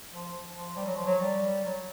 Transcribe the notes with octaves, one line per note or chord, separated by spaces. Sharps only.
F3
F3
G3
F#3
F3
F#3
G3
F#3